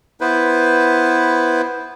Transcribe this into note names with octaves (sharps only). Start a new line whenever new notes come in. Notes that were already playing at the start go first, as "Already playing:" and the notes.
B3 E4 B4 C5